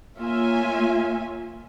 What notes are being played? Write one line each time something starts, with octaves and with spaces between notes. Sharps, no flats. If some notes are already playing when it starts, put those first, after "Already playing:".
A#3 F4 C#5 E5 G#5